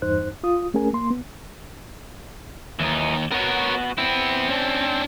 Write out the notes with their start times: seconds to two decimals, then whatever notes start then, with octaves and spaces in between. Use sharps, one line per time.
0.02 E2 G2 D#4 C5 F#6
0.44 F4 D#6
0.74 A3 C#4 G#4 A#4 G#5
0.93 A#3 C6
1.10 B3
2.80 D#2 E3 D#4
3.31 B3 F#4 A#4 C#5
3.98 B3 C4 E4
4.49 C#4 D4